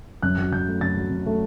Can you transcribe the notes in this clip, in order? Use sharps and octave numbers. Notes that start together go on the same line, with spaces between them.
F#2 F#6
F#3
F#2 G6
A3
F#2 A6
F#3
F#2
A3